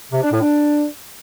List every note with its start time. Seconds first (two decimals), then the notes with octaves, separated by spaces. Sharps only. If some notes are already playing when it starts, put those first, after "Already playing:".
0.12 C3
0.22 D4
0.31 A2
0.41 D4